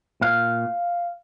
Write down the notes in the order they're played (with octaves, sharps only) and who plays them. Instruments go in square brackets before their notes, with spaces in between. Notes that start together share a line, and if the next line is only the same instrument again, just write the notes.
[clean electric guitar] A#2 F5